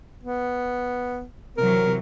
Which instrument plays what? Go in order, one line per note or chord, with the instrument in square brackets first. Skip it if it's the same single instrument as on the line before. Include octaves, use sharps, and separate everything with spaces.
[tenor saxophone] B3
[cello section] C3 E3 F#3 [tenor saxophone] A#4